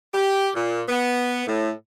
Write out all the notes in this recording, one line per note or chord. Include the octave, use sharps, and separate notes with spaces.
G4
A#2
B3
A2